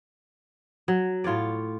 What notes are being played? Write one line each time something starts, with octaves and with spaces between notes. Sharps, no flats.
F#3
A2 F4 C#5 D5